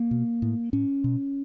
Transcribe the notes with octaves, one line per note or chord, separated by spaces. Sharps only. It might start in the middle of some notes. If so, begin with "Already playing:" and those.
Already playing: A#3
B2
A2
A2 C#4
B2